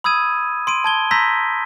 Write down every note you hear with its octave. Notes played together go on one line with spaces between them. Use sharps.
B5 D#6 E6 G#6 D#7
C6 D7 D#7
A5 G#6 G7
A#5 C6 E6 G6 A#6 B6